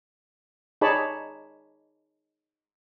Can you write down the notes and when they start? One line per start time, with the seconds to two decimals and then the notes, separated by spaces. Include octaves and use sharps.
0.81 D#4 G#4 C#5 D5 A5 B5